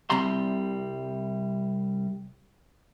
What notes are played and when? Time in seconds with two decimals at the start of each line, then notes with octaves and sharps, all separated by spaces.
0.10 C2 C3 G3 A#5 C6